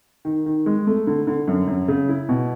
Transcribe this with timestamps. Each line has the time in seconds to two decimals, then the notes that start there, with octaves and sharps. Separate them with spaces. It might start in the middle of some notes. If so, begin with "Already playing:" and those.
0.25 D#3
0.46 D#3
0.66 G#3
0.87 A3
1.07 D3
1.27 D3
1.47 F#2
1.67 F#2
1.88 C#3
2.08 E4
2.29 B2